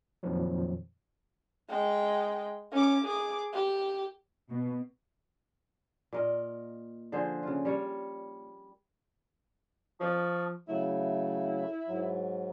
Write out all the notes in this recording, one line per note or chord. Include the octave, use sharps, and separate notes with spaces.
F2 A#2 D#3 F3 F#3
G#3 G5
C#4 D6
G#4 D6
G4
B2
A#2 A#4 D#5
D3 F3 G#4 C5
C#3 F4
G3 A#4 C#5
F3 A5 C#6 D#6
C#3 F#3 A3 E4
G#2 F#3